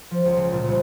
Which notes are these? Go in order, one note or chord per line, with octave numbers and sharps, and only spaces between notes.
F3
C#2
C#3
A#2
C2